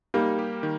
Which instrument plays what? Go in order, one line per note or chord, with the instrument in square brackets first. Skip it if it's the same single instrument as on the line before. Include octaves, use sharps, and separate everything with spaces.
[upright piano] G3 A#3 [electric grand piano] D#4
[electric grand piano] G4
D#3